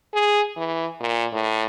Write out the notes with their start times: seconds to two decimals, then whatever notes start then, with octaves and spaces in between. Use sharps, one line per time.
0.14 G#4
0.57 E3
1.00 A#2
1.33 A2